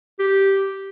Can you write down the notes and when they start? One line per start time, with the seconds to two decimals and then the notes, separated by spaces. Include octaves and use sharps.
0.19 G4